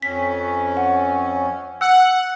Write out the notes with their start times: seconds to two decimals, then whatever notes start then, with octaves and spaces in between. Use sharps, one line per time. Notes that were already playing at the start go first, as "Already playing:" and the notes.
0.02 F2 C#4 B6
0.77 F#5
1.81 F#5 E6